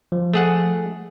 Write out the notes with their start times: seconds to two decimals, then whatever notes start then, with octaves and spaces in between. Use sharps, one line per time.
0.12 F3
0.34 A3 G#4 F#5